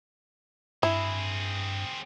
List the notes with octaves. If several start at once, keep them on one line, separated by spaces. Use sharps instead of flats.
G2 C4 E4 G#4